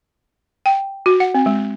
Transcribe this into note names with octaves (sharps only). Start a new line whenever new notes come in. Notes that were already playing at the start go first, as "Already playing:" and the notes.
G5
F#4
F#5
C4
G#3